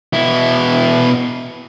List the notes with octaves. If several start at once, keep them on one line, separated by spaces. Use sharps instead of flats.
B2 E4